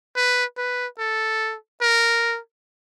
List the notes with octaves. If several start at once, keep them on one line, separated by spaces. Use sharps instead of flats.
B4
B4
A4
A#4